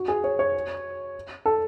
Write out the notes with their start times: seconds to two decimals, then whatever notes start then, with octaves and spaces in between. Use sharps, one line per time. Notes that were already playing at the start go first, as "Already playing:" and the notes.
Already playing: F#4
0.08 G#4
0.24 C#5
0.39 C#5
1.46 A4